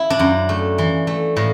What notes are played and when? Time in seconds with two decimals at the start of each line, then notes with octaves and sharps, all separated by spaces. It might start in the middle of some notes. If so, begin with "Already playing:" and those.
Already playing: E4
0.10 D4
0.19 F#2
0.49 A3
0.78 E3
1.07 A3
1.36 A2